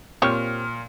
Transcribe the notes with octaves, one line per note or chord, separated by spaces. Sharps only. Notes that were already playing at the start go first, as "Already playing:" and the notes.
A#2 C4 G4 C#5 F6